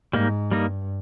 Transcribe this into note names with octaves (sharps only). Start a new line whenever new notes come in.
G#2 G3 A#3 D#4
G2 G3 A#3 D#4